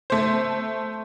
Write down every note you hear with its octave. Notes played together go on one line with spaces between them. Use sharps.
A3 C5